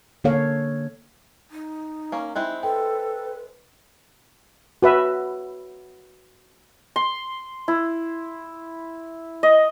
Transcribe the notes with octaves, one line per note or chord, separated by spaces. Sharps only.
D3 A#3 A4 C#5 F5
D#4
A#3 C#4
G#3 C4 E4 F#6
A4 B4 G5
F#4 B4 E5
C6
E4
D#5